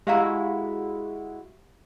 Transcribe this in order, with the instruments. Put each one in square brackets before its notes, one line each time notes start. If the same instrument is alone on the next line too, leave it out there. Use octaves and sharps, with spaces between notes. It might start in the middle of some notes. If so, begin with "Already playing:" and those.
[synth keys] G#3 E4 F#4 [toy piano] G4 F5 A#5